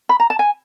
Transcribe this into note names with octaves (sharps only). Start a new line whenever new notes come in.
B5
A#5
A5
G#5